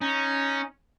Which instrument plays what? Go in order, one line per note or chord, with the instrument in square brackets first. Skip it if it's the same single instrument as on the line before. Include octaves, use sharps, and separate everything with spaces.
[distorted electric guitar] C#4 [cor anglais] D#4